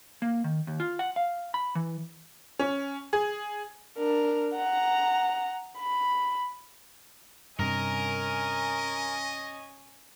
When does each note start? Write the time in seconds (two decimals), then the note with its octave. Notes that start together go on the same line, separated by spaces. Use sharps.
0.22 A#3
0.44 D#3
0.67 D#2
0.80 F4
0.99 F#5
1.16 F5
1.54 B5
1.75 E3
2.59 C#4
3.13 G#4
3.98 D4 A#4
4.55 F#5 A#5
5.78 B5
7.59 G2 C3 C#4 A#4 D#5 G#5